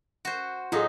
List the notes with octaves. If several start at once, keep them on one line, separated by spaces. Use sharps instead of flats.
F#4 C5
A2 F#3 D#4 F4 G#4